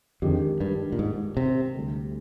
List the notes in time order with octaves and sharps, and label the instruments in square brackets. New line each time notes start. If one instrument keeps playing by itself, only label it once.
[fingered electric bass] F2 [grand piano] D#3 G#3 D4 G4
[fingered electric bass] G2
A#2
G#2
C3
[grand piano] D2 D3 G3